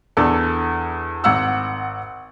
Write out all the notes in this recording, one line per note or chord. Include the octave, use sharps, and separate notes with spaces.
E2 D4 A4
G#1 F#5 E6